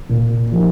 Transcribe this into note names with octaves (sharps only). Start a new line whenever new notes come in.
A#2
F3 A#3 D#4 G4